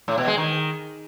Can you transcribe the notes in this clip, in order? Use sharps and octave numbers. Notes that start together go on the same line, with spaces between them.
A2
B2
G#3
D#3